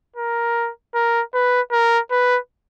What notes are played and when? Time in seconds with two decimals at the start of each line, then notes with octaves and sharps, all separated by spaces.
0.16 A#4
0.95 A#4
1.34 B4
1.72 A#4
2.11 B4